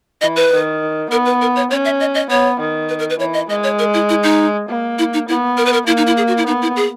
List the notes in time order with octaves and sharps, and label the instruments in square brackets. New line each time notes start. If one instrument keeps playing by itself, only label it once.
[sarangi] E3 [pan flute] D#5
[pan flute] B4
[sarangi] D#3
[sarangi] B3 [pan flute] A#4
[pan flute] B4
A#4
C#5
[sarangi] C#4 [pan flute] C#5
[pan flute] E5
D#5
D#5
[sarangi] B3 [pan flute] C#5
[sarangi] D#3
[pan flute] B4
A#4
B4
[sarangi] E3 [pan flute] C#5
[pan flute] D#5
[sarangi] G#3 [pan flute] D#5
[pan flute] C#5
A#4
E4
E4
D#4
[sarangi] A#3
[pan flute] E4
D#4
[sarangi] B3 [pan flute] E4
[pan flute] A#4
B4
A#4
[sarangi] A#3 [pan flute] E4
[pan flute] D#4
E4
G#4
F#4
E4
[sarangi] B3 [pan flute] D#4
[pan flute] E4
G#4